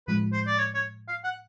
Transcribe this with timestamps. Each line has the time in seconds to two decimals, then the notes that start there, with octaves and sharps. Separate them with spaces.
0.08 A2 F3 G#3 B4
0.33 C5
0.47 D5
0.58 C#5
0.75 C#5
1.08 F5
1.24 F#5